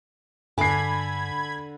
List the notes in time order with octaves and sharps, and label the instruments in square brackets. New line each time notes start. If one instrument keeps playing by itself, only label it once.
[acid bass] G2 [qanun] D3 D6 [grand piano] G#5 C7 [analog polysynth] B5 G#6